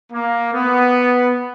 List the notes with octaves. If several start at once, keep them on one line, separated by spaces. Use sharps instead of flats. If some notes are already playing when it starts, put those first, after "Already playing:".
A#3
B3